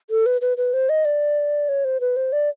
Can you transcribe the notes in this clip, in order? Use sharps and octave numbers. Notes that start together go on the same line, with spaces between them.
A4
B4
B4
B4
C5
D#5
D5
C#5
C5
B4
C5
D5